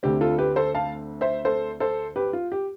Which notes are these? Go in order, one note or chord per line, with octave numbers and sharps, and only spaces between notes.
D2 D3 A3 C4 G4
F4 A4
G4 B4
A4 C5
F5 A5
C5 E5
A4 C5
A4 C5
G4 B4
F4
G4